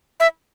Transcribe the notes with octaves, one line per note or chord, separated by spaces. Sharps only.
E5